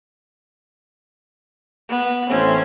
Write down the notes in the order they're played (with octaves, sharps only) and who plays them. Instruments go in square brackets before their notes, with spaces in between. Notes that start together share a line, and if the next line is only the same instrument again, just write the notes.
[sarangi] B3
[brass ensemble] A1 A3 C4 [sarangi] C#4